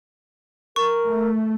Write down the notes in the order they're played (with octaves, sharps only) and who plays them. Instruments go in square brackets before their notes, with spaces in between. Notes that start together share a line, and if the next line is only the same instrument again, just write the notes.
[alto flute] A#4 [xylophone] C#6
[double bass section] A3